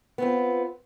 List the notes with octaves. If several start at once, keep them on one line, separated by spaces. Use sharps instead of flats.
B3 C4 F4